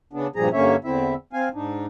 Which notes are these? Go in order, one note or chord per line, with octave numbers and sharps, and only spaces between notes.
C#3 B3 D4
G2 A#2 F3 G3 G#4 A#5
G2 D3 A#3 C#4 C#5 E5
E2 D3 C4 E4 E5
C4 F5 G#5
G#2 D4 D#4